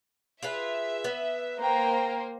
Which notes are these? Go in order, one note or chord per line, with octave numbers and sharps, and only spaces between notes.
F4 G#4 B4 E5
B3
A#3 A#4 C5 G5 A#5